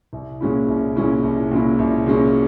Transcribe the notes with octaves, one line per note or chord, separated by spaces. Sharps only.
C2
A#2 G#3 C#4 E4
C2
A#2 G#3 C#4 E4
C2
A#2 G#3 C#4 E4
C2
A#2 G#3 C#4 E4